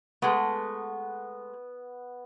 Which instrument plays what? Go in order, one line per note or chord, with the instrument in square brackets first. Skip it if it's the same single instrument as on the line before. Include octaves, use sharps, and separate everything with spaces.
[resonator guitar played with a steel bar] G#3 A3 [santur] B3